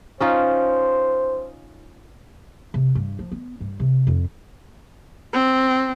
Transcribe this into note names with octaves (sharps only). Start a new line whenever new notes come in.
C#4 D#4 F4 C5
C3
G2
F3
B3
G2
C3
F2
C4